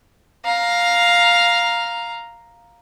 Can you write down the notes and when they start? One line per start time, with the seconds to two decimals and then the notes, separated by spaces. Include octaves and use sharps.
0.45 F5 A#5